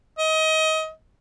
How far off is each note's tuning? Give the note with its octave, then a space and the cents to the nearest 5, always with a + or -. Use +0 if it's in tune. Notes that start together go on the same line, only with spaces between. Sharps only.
D#5 +25